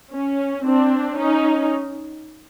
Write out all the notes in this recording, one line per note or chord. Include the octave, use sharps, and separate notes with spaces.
C#4
C4 D4
C#4 D#4